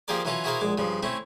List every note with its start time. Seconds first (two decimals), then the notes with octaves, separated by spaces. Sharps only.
0.08 F3 A#3 G4 G#4 A#4 D5
0.25 E3 F#3 C#4 F4 A4
0.44 E4 F#4 G#4 A#4 C5 F5
0.61 A#1 G#3 D6
0.78 G2 C#3 F3
1.03 A3 C4 C#4 E4